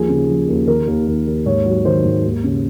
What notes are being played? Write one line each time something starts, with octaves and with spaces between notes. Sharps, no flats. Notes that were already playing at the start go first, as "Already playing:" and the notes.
Already playing: D#2 F3 G#4
C#3
F3
D#2
D#3 A#4
D#2
D#2
D#2
G#2 C#5
F#3
D#3 C5
G#2
D#2
C#3